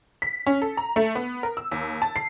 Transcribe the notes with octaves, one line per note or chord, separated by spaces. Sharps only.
B6
C#4
A4
A#5
A3
B3
A#4
E6
D#2
A5
C7